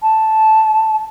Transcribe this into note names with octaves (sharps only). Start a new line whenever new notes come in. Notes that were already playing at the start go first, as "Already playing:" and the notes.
A5